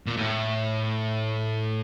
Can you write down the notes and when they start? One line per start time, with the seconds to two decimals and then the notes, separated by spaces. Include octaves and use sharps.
0.07 A#2
0.17 A2